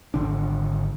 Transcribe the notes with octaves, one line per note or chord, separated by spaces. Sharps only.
G#1 D3 D4